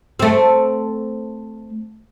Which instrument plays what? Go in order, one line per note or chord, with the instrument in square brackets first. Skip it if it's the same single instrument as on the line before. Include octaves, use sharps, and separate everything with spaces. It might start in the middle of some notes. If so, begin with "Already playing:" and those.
[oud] A3 C4